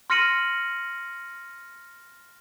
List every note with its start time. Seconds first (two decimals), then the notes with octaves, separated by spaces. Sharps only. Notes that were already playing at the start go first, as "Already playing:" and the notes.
0.10 C6 F6 A#6 C#7 D#7 F#7